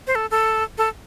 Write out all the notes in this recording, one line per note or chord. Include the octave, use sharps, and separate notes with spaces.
C5
A4
A4
A4